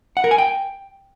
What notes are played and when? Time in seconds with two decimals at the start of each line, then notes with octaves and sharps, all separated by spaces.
0.17 F#5
0.24 A#4
0.31 G#5
0.38 G5